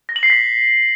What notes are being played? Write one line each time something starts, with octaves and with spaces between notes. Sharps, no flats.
A#6
F#7
C7
B6